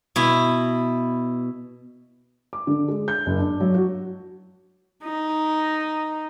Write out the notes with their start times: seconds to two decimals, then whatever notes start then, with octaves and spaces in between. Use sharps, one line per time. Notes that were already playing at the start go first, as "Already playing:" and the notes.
0.16 B2 E4
2.53 D6
2.67 D3
2.88 G#3
3.08 G6
3.26 F#1
3.39 D4
3.60 F#3
3.74 F#4
5.04 D#4